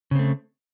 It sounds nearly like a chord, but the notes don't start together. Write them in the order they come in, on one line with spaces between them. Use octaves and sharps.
C#3 C4 A3